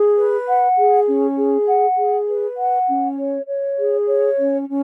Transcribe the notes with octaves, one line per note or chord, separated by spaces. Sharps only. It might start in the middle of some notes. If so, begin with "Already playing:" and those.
Already playing: G#4
B4
F#5
G#4
C#4
G#4
F#5
G#4
B4
F#5
C#4
C#5
C#5
G#4
C#5
C#4
C#4